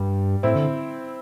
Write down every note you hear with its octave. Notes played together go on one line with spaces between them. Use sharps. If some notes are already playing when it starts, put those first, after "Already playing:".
Already playing: G2 G3
A2 C4 E4
D3